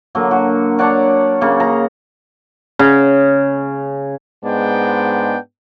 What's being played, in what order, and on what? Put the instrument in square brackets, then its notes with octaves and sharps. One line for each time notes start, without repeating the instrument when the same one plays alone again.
[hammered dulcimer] D3 F#3 A#3
F#4
D4 C#5 D5 F#5
C#3 A#3
G#4 A#5
C#3
[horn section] G#2 G#3 B3 D4 G5